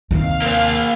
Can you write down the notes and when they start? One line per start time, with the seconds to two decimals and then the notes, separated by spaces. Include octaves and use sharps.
0.11 D#2 C3 F5
0.42 A#3 C5